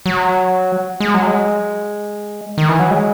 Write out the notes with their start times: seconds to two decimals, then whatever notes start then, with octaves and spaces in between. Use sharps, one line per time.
0.06 F#3
1.00 G#3
1.14 F#3
1.27 G#3
2.58 D#3
2.69 E3
2.79 F#3
2.90 G#3